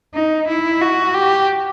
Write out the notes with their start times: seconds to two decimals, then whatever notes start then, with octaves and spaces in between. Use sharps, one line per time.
0.14 D#4
0.48 E4
0.81 F#4
1.14 G4